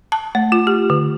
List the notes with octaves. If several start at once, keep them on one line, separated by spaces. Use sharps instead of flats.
A5
A3
F4
G4
D3